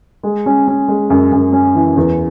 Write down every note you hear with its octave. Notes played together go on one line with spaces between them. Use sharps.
G#3
C#4
C#4
G#3
F#2
F#2
C#4
E3
E2